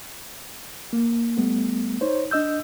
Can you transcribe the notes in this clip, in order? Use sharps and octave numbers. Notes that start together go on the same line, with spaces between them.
A#3
G3 A3 B3
D#4 C5 C#5
D4 D#5 E6 G6